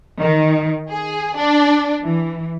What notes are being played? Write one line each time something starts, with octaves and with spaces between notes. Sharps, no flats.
D#3
G#4
D4
E3